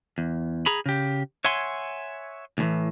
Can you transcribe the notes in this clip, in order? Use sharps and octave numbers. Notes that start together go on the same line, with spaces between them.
E2
G#4 A#5 B5
C#3 G4
C#5 E5 F#5 G#5 C6
D2 A2 E3